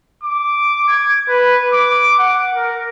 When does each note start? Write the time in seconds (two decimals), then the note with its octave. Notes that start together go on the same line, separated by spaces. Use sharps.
0.23 D6
0.89 G#6
1.29 B4
1.73 D6
2.19 F#5
2.54 A#4